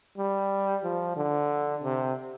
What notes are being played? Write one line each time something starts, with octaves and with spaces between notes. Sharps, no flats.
G3
F3
D3
C3